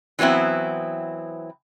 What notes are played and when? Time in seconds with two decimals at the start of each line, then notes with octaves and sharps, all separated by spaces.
0.19 E3 F#3 B3 C4 E4